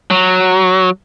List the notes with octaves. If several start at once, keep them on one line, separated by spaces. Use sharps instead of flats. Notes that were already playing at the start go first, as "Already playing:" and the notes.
F#3